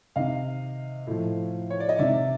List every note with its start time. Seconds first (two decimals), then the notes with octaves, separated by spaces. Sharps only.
0.16 C3 D#3 D#5 F5
1.07 A2 F3
1.70 C#5
1.80 D5
1.89 D#5
1.99 C3 D#3 D5 E5